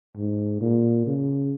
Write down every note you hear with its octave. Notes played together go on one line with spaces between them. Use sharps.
G#2
A#2
C#3